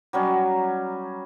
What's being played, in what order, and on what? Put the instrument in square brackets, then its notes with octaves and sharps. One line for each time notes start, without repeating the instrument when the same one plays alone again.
[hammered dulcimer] F#3 G3 C#4